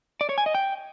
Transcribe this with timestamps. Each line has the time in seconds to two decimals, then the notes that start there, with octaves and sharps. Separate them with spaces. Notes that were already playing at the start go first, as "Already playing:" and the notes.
0.21 D5
0.29 C#5
0.38 G#5
0.46 D#5
0.55 G5